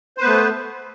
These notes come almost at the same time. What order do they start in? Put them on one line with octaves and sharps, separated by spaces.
C5 B4 B3 A3